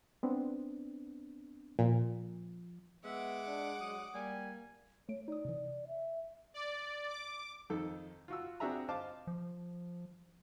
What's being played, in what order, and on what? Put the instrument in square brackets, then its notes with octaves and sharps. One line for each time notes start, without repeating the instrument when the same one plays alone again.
[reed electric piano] B3 C4 D4
[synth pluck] A#2 [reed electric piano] F3
[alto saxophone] G#3 [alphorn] B3 [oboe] E5 [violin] F#5 D6
[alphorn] D4
[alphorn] F#3 [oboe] D#6
[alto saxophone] G3 [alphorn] A#3 [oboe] G#5
[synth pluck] A3 D7 [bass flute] C#5
[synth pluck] D#4 D#6 [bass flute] D5
[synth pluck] C3 E3
[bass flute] E5
[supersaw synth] D5
D6
[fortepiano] F2 D#3 A4
F4 F#4 E6
C4 D4 F#4 G#4 E5 A#5
C5 D#5 F5 A5 D6
[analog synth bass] F3